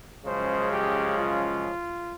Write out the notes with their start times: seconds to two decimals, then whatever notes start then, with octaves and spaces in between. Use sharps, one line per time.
0.24 F#2 C#3 F3 G#3 C5
0.70 G4
1.16 F4